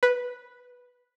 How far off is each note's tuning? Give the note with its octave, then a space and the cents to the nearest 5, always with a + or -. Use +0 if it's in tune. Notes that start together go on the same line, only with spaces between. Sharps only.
B4 -5